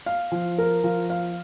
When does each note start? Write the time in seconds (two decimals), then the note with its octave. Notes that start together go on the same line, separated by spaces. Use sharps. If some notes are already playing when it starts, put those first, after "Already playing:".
0.06 F5
0.32 F3
0.58 A#4
0.84 F3
1.10 F5